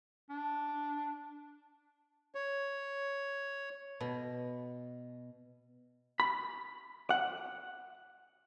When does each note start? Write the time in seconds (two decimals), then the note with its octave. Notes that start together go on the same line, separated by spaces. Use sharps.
0.30 D4
2.35 C#5
4.01 B2
6.20 B5
7.10 F#5